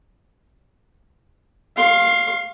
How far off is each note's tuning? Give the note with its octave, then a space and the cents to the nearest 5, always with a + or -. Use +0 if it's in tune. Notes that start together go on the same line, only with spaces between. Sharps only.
F5 +0 C6 +40